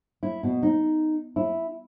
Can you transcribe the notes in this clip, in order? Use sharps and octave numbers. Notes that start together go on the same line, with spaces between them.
E4
B2
D#4
E4